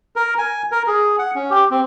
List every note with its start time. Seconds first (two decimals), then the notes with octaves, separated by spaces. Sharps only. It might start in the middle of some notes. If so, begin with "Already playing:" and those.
0.16 A#4
0.38 G#5
0.72 A#4
0.87 G#4
1.19 F#5
1.35 C#4
1.50 G4
1.71 C4